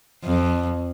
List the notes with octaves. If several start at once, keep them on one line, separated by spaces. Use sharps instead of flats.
F2